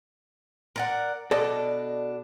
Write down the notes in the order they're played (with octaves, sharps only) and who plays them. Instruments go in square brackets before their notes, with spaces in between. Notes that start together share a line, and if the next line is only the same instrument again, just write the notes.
[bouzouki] A#4 D5 F#5
[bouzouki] B2 D4 [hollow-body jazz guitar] A4 D5 D#5